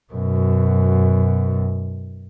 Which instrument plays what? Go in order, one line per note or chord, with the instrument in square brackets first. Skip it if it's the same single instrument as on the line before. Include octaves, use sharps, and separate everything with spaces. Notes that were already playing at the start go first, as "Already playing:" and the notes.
[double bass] F#2 B2